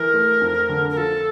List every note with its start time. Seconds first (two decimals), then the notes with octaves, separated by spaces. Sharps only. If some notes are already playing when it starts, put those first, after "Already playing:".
Already playing: E3 A#4
0.14 A3
0.41 F2
0.69 D3
0.90 A#4
0.97 F3 A4